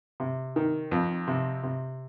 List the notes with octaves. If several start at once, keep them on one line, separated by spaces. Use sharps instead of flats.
C3
D#3
F2
C3
C3